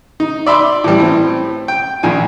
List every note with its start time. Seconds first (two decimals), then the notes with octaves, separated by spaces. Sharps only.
0.20 D#4
0.46 D5 E5 B5 C6 D6
0.84 A2 E3 G3
1.00 A2 C4
1.68 G5
2.03 A#1 A#2 D#3 G#5